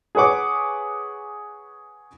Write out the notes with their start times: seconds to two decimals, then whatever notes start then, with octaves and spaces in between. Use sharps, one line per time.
0.15 G#4 B4 C#5 F#5 D6